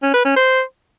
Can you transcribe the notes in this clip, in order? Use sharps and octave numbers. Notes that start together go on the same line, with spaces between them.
C#4
B4
C#4
C5